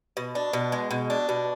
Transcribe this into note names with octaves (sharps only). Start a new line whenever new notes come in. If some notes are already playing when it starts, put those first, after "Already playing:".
B2
D4
B2
G#3
B2
D4
B2